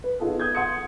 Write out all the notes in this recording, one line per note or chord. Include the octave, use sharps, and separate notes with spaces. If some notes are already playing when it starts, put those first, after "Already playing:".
B4
B3 D#4 F4 G#4 A4
D#6 G6 G#6
F#5 C6 D#6 G#6 C#7